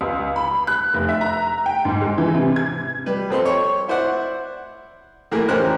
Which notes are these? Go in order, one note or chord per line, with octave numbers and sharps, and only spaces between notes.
C#2
B5
F#6
F1
E5
A#5
G5
G#2
G#3
E3
C3
G#6
G3 B4
F2 C4 A4 C6
C#5
E4 C5 D5 F#5
A2 E3 A#3 G#4 A#4
E2 C#4 G4 A#4 C5 F#6